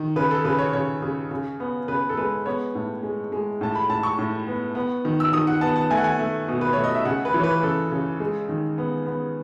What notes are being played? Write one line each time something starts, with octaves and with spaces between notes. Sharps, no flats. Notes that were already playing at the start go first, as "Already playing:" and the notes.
Already playing: D#3
C#3 B4
A4
C#3 B4
C#5
C#3 C#5
C#3
C#3
B3
C#3 B4
A4
G#3 B4
B3 C#5
A2
G#3
G#3
A2 A5
B5
A2 A5
C#6
A2
B3
B3
D#3
E6
D#3 D#6
F#5
B3 A5
A5
A3 G#5
F#5
G#5
A3
B2
B4
A3 C#5
D#5
E5
C#3 F#5
B4
E3
C#5
B4
C#3 A4
C#3
G#3
D#3
B3
B3